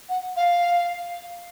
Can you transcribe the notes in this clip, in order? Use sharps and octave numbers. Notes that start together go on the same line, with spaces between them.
F#5
F5